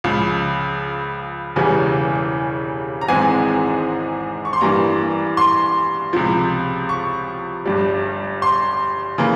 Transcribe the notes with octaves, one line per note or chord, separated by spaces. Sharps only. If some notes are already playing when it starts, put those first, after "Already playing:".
C#2 C#3 F3
E1 E2 C#3 E3 G3 G#5
A#5
G#1 G#2 E3 G#3 C4 G#5
C#6
C6
G2 E3 G3 A#3 A#5
C6
C#2 C3 F3
C#6
G1 G2 G3
C6
C#3 E3 A#3